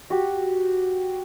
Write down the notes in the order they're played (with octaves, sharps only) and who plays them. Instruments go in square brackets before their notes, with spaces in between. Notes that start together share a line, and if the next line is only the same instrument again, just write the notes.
[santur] F#4 G4